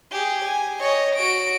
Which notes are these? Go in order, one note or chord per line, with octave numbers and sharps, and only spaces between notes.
G4 G#4
G#5
C#5 D#5
F#4 D7